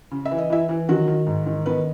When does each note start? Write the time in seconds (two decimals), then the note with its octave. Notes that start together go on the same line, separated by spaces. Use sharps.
0.11 C#3
0.25 E5
0.31 E3
0.38 D#5
0.50 E3 E4 E5
0.69 E3
0.89 D#3 F#3 F#4
1.07 D#3
1.27 G#2
1.46 D#3
1.66 D#3 B3 B4